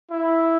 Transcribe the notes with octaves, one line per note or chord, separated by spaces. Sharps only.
E4